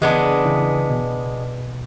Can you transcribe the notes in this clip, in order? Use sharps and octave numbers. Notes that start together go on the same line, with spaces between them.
C#3 E3 G#3 B3 D4
C#3 E3
B2